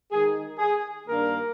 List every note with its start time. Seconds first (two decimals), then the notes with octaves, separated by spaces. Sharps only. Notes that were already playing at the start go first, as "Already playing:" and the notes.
0.11 D#3 G#3 D#4 G#4
0.58 G#4
1.05 G2 D#3 A#3 D4 A#4